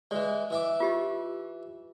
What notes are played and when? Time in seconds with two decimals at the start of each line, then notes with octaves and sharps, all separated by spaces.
0.11 E3 G#3 D5
0.50 E3 E5 D6
0.80 F4 G4 D#5